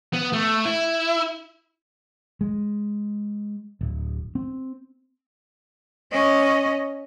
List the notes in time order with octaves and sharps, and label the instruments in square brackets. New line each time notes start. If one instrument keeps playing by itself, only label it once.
[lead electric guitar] B3
A3
E4
[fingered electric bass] G#3
D1
C4
[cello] C#4 D#5